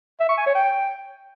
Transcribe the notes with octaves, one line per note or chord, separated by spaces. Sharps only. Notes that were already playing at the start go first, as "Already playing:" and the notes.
E5
C#6
G#5
C#5
G5